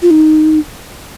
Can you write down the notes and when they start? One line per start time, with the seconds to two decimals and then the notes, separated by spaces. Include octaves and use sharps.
0.02 F4
0.11 D#4